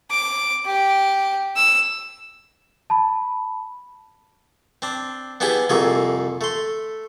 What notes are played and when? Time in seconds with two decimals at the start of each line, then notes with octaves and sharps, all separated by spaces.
0.11 D6
0.66 G4
1.57 E6
2.90 A5 B5
4.82 C4 D4
5.40 B3 D4 E4 G4 G#4
5.70 C2 F2 A3 A#3 G#4
6.41 A3 C6